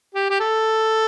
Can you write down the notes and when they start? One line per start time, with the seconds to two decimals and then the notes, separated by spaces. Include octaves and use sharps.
0.15 G4
0.31 G4
0.40 A4